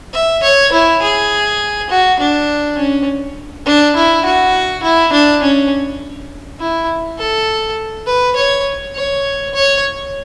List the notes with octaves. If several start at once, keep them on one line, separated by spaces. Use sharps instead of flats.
E5
C#5
E4
G#4
F#4
D4
C#4
D4
E4
F#4
E4
D4
C#4
E4
A4
B4
C#5
C#5
C#5